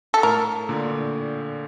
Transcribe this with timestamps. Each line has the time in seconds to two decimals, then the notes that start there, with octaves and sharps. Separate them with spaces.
0.14 A4
0.23 A2 A#4
0.69 A#2 D3
0.91 A#2